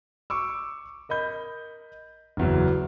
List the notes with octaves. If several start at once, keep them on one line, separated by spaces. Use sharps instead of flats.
C#6 D6 E6
A#4 D#5 B5 G6
F#1 E2 F#3